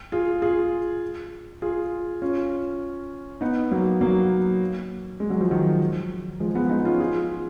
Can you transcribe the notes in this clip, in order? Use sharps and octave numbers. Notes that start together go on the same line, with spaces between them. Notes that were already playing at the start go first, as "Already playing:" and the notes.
F4 G#4
F4 G#4
F4 G#4
C#4 F4
B3 D#4
F#3 A#3
F#3 A#3
G#3
F#3
F3
D#3 F#3
F3 G#3
G#3 B3
B3 D#4
C#4 F4
F4 G#4